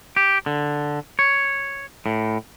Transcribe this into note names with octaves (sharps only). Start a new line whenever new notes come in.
G4
D3
C#5
A2